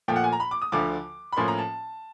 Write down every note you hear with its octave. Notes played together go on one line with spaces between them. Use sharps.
A#2 F3 A3 G5
F#5
G#5
A#5
B5
D6
D#6
D2 D3 F3 D6
B5
A2 F3 A#3 C#4 C6
A#5
A5